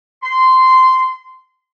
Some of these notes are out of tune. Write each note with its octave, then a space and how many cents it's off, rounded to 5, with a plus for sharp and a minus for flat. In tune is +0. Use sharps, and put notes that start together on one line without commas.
C6 -15